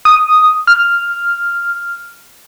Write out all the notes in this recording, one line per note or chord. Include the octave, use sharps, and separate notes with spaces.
D#6
F6